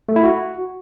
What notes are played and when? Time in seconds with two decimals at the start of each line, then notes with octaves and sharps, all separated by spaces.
0.09 A3
0.16 E4
0.24 F#4